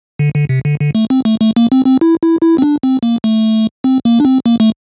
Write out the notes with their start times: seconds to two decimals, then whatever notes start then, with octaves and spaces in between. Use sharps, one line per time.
0.19 D3
0.35 D3
0.49 C3
0.65 D3
0.80 D3
0.95 A3
1.10 C4
1.25 A3
1.40 A3
1.56 A#3
1.72 C4
1.86 C4
2.01 E4
2.23 E4
2.42 E4
2.58 C4
2.62 D4
2.83 C4
3.03 A#3
3.24 A3
3.84 C4
4.05 A#3
4.20 D4
4.25 C4
4.46 A#3
4.60 A3